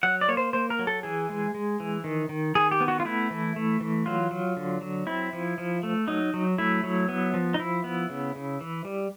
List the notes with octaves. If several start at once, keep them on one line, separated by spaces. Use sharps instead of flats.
F#3 F#5
D5
A#3 C#5
C5
A#3 C5
A#4
F#3
A4
E3 G#4
G#3
G#3
E3
D#3
D#3
D#3 G#4
G4
B3
F#4
F4
A3 E4
E3
A3
E3
F#3 F4
F#3
D3
F#3
C4 E4
F3
F3
A3
F#3 D#4
F#3
A3 E4
F#3
B3
F3
D#4
F3 E4
B3
C#3
C#3
E3
G3